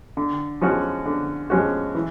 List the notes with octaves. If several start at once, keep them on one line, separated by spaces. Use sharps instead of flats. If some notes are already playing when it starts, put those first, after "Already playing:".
D3
F3 G#3 C#4 F#4
D3
F3 G#3 C#4 F#4
E3